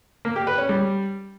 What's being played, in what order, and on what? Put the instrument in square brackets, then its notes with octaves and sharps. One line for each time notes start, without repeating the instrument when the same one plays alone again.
[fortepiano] A#3
G4
B4
C#4
G3